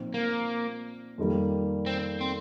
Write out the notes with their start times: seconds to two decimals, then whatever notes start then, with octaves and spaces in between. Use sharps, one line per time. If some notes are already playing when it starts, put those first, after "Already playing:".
Already playing: A#2 F3 C4 D#4
0.14 A#3
1.18 F2 D#3 G3 A#3
1.86 C4
2.21 C4